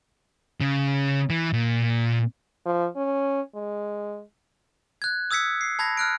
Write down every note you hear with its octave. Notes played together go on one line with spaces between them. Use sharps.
C#3
E3
A#2
F3
C#4
G#3
F#6 G#6
D#6 E6 G#6 B6 C#7
C7
A5 B5 G#6 A#6
F6 F#6 D7